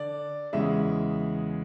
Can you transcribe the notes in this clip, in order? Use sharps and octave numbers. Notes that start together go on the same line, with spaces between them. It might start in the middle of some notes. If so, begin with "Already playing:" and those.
Already playing: D3 D5
E2 C#3 G#3 E5